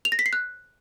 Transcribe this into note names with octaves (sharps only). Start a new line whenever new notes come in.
F7
A#6
B6
C7
F#6